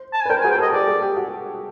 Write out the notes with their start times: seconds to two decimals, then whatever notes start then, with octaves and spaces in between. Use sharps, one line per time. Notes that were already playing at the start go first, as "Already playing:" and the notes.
Already playing: C5
0.13 A5
0.21 G#5
0.26 B4
0.30 A#4 C5 G5
0.41 G#5
0.44 F#4 G#4
0.51 G5
0.58 G4 A4 D#5
0.73 G4 A4 D5
0.87 F#4 G#4
1.02 G4
1.17 F#4